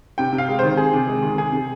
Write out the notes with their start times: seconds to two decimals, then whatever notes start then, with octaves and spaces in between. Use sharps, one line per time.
0.18 C3 G5
0.33 C3
0.38 F5
0.48 G#3
0.59 D#3 C5
0.77 C3 G#4
0.93 C3
1.08 G#3
1.22 D#3
1.38 C3 G#4
1.52 C3